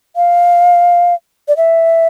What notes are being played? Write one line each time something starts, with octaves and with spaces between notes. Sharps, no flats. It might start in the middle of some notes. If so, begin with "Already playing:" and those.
F5
D5
E5